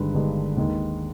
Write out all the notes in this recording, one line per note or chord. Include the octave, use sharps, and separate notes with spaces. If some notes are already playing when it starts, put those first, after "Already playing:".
Already playing: G1 G2 D#3 G#3 B4
G1 G2 D#3 G#3
D#2 D#3 G#3